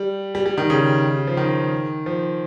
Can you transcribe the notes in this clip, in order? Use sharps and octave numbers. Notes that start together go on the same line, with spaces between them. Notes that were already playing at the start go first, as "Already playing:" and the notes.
Already playing: G3
G3
G3
D#3
C#3
F3
D#3
F3